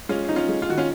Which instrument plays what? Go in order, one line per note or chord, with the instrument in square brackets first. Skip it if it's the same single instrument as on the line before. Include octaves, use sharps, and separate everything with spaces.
[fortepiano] G#3 [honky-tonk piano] C#4 F4
[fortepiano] D#4
[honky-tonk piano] C#4 F4
[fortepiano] G#3
[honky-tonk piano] F4
[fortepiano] D#3 [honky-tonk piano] F#4
[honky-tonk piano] C#4 F4